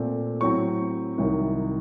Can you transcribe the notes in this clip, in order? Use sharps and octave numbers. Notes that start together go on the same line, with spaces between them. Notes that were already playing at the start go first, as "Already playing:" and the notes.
Already playing: A#2 A3 C4
A2 F#3 C4 C#6
C2 C3 D#3 F#3